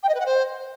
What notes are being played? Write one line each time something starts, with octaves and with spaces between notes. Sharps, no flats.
G5
D#5
B4
F#5
C5